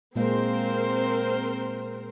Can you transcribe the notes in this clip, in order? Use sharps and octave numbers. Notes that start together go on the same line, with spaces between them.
A#2 G#3 A#3 C4 A#4 C5